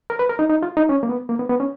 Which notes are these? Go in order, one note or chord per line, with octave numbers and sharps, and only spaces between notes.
A#4
B4
A#4
D#4
D#4
F4
D#4
C#4
A#3
B3
A#3
B3
B3
C#4